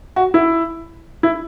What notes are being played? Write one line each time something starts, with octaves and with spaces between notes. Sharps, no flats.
F#4
E4
E4